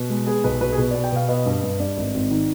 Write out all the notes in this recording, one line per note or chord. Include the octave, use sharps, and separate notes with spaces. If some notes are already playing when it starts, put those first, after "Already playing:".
Already playing: B2 B4
G#3
B3 G#4
B1 B4
B2 B4
G#4
B2 B4
B3 D5
G5
B2 F5
B3 D#5
G2
G2
G2 D5
G#1
G#1
D#3